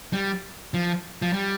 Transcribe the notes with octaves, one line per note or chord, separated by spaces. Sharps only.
G3
F3
F3
G3